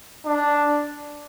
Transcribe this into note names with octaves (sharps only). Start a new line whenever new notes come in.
D4